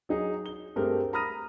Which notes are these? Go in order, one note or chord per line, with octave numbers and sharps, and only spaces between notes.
F#3 D#4 G#4
G7
G2 A3 C4 G4 G#4 A#4
A#5 B5 D#6 F6 A#6 D#7